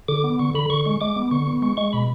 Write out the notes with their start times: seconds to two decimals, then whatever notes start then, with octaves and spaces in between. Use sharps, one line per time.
0.08 D3 D6
0.24 B3
0.39 D3 C#6
0.55 D3 B5
0.70 D3 C#6
0.85 G#3 C#6
1.01 G#3 D6
1.16 B3
1.31 D3 C#6
1.47 B3
1.62 G#3 C#6
1.77 G#3 C#6
1.93 B2 B5